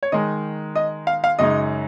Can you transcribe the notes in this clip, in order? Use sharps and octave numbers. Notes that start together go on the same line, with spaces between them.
C#5
D#3 G#3 D#4 D#5
D#5
F5
F5
F#2 C#3 G#3 D#4 D#5